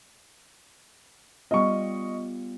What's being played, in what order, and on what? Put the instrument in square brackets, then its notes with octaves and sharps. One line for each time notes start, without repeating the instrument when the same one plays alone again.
[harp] G3 B3 F4 [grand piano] D#5 C#6